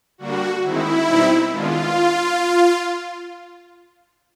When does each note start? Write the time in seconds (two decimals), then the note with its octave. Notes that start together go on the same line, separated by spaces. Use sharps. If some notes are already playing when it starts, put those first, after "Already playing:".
0.18 D3 G3 A#3 D4 F#4
0.63 D#3 G#3 C4 D#4 E4
1.06 B2 G3 C4 D#4
1.50 D#3 G#3 B3 D4 F4